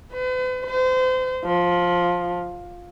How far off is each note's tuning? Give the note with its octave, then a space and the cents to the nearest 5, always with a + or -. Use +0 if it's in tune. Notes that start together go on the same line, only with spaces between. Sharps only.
B4 +45
C5 -35
F3 +10